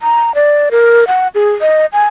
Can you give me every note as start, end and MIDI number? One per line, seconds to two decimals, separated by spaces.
0.01 0.34 82
0.35 0.69 74
0.71 1.04 70
1.07 1.28 78
1.35 1.51 68
1.61 1.86 75
1.93 2.07 80